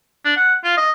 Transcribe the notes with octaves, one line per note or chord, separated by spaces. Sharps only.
D4
F#5
F4
D#5